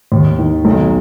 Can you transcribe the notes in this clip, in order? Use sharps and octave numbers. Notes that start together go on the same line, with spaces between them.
D#2
D#3
B1